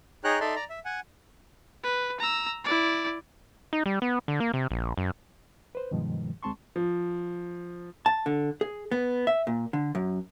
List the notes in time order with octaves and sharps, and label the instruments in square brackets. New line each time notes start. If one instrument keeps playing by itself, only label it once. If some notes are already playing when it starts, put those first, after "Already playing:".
[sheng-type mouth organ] D#4 G#4 C#5 G5 A#5 F#6
D#4 A4 D5 E5 C6
D5 A#5
E5
F#5 G#5
[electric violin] B4
A#5 E6
E4 D5
[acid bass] D#4
G3
B3
D3
A#3
C3
A#1
F#2
[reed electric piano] B4 C5
G2 B2 D#3 F3 G#3
D2 G#3 C4 A5 C6 C#6
[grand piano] F3
[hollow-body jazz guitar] A5
D3
G#4
B3
E5
A#2
D3
F#2